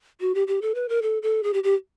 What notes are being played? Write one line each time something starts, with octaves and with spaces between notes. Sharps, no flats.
F#4
G4
G4
A4
B4
A#4
A4
A4
G#4
G4
G4